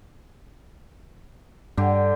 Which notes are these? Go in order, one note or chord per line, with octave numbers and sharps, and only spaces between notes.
G2 D3 G4